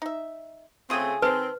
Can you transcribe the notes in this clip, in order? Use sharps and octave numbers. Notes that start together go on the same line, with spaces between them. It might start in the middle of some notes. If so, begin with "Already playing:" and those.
D#4 E5
C#3 A3 C4 F4 G#4 G5 D#6
D#3 C4 B4 C5 A5